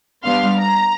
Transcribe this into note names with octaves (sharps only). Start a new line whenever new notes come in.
G3 B3 D4 F5 C6 F6
A#5